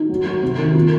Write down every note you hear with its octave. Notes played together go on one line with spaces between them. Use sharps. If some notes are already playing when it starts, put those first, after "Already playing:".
Already playing: D#4
F#3
F#3
C3
D#3
A#2